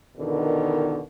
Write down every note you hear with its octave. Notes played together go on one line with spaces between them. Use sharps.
E2 B2 D3 D#3 A#4